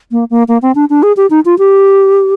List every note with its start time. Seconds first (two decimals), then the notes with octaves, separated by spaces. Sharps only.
0.12 A#3
0.30 A#3
0.48 A#3
0.62 C4
0.75 D4
0.90 D4
1.03 G#4
1.17 G4
1.30 D#4
1.45 F4
1.59 G4